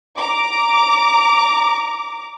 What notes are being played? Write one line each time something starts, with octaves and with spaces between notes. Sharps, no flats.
A#5 D6